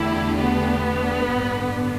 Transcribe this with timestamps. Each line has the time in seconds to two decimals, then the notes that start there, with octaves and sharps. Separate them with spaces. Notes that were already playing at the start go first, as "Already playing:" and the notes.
Already playing: E2 D3 A3 D4 E4 G4
0.39 B3
1.32 A1 G2 D3